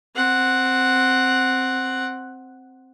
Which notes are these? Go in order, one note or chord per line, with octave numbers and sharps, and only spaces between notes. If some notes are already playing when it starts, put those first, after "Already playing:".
C4 F#5